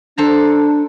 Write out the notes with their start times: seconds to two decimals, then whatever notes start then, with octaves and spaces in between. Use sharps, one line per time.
0.18 D4 A4 C5 A#5